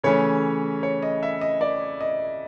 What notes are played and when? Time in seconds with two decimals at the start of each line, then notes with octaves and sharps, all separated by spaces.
0.04 C#3 E3 A3 C#4 C#5
0.83 C#5
1.02 D#5
1.23 E5
1.41 D#5
1.61 D5
2.01 D#5